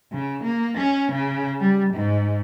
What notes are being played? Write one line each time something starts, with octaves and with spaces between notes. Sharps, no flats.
C#3
A#3
C#4
C#3
G3
G#2